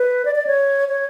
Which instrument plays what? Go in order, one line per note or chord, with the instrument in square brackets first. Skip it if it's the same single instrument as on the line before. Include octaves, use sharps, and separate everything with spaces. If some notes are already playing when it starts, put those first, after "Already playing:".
Already playing: [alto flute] B4
D5
D5
C#5
C#5